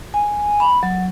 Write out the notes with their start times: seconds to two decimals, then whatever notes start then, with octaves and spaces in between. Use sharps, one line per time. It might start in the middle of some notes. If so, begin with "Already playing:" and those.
0.14 G#5
0.60 B5
0.83 F#3